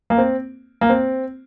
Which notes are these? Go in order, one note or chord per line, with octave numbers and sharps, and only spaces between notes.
A#3
C4
A#3
C4